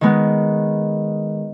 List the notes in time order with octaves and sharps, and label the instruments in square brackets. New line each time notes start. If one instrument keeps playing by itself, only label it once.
[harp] D#3 G#3 B3